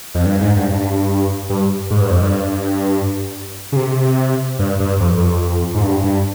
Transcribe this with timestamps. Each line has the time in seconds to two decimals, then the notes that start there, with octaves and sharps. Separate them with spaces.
0.15 F2
0.25 G2
0.41 G#2
0.56 G2
0.72 G2
1.49 G2
1.90 G#2
2.01 G2
2.11 F2
2.21 G2
3.72 C#3
3.76 C3
4.59 G2
4.80 G2
5.00 F2
5.18 F2
5.74 G#2
5.83 G2
6.04 G2